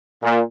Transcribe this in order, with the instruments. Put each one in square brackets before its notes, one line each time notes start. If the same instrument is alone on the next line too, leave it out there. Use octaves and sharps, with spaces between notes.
[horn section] A#2